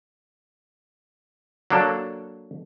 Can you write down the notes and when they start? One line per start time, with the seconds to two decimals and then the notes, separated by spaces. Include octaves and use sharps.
1.70 F#3 A#3 D4 A4